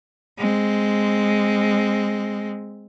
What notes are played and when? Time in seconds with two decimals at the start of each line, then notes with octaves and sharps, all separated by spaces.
0.38 G#3 C4